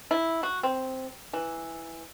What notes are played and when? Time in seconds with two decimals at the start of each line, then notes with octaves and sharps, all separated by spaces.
0.11 E4
0.43 F#4
0.63 C4
1.33 E3